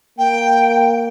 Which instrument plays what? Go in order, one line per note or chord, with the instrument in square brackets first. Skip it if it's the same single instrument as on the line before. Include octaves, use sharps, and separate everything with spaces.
[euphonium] A#3 [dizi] G5